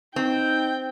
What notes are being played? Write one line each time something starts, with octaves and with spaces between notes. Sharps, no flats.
C4 D#4 G5